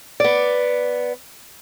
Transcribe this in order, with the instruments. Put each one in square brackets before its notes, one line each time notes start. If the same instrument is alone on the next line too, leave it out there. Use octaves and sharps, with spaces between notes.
[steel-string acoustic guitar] B3 D5